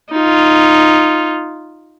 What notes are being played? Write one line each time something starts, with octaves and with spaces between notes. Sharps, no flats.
D#4 F4